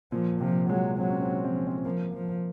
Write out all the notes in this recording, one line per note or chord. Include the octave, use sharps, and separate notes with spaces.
A#2 F3
C3 F3
F#3 G#3
F#3 C4
C#4
C4
C#4
F3 C4
C#4
C4
C4
F3 A#3
F3